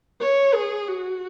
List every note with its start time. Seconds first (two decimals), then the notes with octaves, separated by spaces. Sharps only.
0.20 C#5
0.53 G#4
0.87 F#4